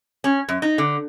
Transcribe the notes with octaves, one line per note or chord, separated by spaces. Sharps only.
C#4
F#2
D#4
D3